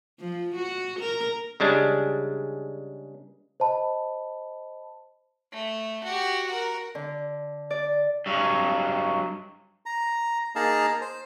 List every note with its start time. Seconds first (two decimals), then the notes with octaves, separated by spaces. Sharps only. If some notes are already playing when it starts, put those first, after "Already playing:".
0.20 F3
0.56 F#4
1.00 A#4
1.60 C#3 G3 G#3 D4
3.60 C5 D#5 A5 B5
5.52 A3
6.04 F#4 G4
6.46 F#4 A#4
6.95 D3
7.70 D5
8.26 G2 F#3
9.86 A#5
10.55 A#3 D#4 G#4 F5 A5 A#5
11.01 C5